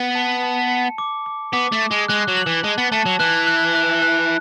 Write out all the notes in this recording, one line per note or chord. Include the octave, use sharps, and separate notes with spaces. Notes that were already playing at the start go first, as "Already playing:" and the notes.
Already playing: B3
A5
A5
C#7
D6
D6
B3 D6
A3
D6
G#3
G#3 F#6
F#3
F#7
E3
G#3 A5
B3
A3 A5
F#3
E3 F#6
F#6
F#6
F#6